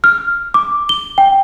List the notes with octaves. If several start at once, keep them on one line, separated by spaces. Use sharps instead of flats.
F6
D6
G7
G5